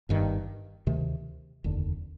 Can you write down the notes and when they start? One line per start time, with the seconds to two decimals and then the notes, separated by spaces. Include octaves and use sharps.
0.09 G1 G2 D#3
0.87 D2 C3 D#3 A3
1.64 F1 D#2 D3